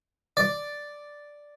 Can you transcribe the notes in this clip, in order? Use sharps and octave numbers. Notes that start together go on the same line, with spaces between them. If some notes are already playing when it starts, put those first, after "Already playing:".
D5